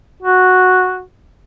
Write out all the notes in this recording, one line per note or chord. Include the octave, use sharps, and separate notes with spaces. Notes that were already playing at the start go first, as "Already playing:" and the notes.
F#4